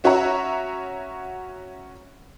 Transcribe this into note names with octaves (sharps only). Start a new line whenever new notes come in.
C#4 F#4 C#5 E5 F#5 A#5